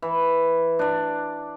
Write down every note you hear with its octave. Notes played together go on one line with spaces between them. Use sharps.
E3
D4 D5